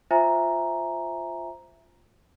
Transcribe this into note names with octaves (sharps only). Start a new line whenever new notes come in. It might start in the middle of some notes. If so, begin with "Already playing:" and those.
F4 C5 E5 G#5 A#5